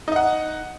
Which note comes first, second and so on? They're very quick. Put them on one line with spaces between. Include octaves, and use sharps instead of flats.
D#4 D#5 F#5